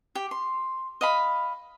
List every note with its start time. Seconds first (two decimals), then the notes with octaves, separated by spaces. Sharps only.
0.15 G4
0.31 C6
1.01 D#5 F5 B5